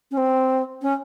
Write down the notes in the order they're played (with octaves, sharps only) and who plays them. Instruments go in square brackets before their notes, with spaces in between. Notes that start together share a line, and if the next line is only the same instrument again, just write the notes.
[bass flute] C#4
C4
C#4